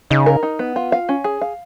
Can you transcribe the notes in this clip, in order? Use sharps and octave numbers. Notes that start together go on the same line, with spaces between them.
C#3 D#4
A#4
D#4
B3
F4
F5
C#4
G#4
F5